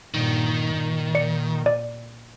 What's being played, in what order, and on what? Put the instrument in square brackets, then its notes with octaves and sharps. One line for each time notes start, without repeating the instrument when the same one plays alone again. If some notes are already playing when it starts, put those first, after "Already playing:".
[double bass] G2 A#2 [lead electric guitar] D#3
[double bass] A#2
[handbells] D5 C#7
D5